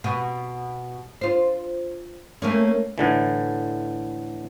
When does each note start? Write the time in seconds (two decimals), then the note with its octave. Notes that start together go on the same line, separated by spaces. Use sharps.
0.04 B2
1.21 F4 C5
2.42 A3 A#3 C#4
2.98 A2 D3 E3